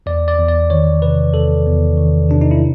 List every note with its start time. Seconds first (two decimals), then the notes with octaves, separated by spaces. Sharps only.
0.06 E2 D5
0.28 D5
0.38 E2
0.49 D5
0.70 D#3 C#5
1.02 C3 B4
1.34 E2 A4
1.66 E2
1.97 D#3
2.29 C3 D4
2.41 D#4
2.51 E4